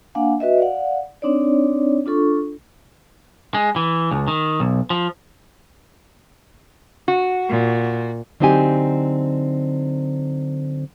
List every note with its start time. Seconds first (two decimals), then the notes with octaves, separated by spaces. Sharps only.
0.15 A#3 D4 F5 F#5 G#5
0.40 F#4 B4 D#5 E5
0.58 D5 F5 F#5
1.22 C4 D4 D#4 C#5 D5
2.06 D4 F4 A4 C#6
3.54 G#3
3.76 E3
4.11 C#2
4.28 D#3
4.60 B1
4.90 F3
7.08 F#4
7.49 A#2
8.40 D3 F#3 C4 D#4 G4 G#5